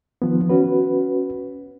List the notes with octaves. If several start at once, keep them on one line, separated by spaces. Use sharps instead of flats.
D#3 F3 B3
C#4 F#4 B4